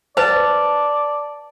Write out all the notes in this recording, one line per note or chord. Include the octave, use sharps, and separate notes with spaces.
B4 C5 D5 A5